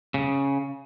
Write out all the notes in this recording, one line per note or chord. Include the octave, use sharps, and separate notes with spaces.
C#3